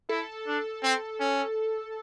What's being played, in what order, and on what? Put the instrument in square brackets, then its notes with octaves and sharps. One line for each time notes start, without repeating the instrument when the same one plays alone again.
[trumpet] E4 [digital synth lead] A4
[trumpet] D4
C4
C#4